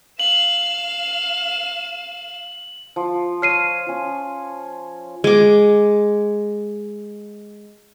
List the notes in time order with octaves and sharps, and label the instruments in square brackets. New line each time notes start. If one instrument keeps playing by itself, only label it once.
[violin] F5 E7 [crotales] F#7
[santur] F3
[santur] C#5 [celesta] F6 C7 D#7
[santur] C#4 F4
[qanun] G#3 D6